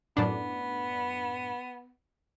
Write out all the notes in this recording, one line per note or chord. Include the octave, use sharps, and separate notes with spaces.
F#2 A2 B3 D4